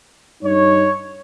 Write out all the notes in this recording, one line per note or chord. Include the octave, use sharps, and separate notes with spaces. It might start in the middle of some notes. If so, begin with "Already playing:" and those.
G2 D#4 C#5